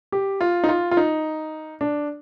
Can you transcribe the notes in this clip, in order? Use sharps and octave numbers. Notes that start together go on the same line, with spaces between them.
G4
F4
D#4
F4
F4
D#4
D4